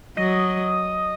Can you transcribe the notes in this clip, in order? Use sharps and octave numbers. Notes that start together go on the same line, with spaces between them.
F#3 D#5